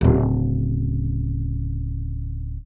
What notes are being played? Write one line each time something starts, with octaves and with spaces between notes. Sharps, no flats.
D1 C#3